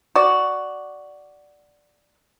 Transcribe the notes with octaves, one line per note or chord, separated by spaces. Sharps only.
F#4 D5